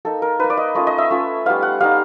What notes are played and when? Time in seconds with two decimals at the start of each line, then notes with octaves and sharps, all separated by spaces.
0.05 A#3 D#4 A4
0.22 A#4
0.39 A#3 D#4 B4
0.50 D5
0.57 D#5
0.75 A3 C#4 F4 D#5
0.87 D#5
0.98 E5
1.11 A3 C#4 F4
1.46 G3 B3 D#4 F5
1.63 F#5
1.80 G3 B3 D#4 F5